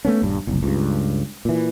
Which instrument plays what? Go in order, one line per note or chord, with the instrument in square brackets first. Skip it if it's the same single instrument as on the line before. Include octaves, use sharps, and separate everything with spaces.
[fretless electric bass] A3 B3 C#4
D#1 G2
F#1 C2
C#2 G2
A#2 E3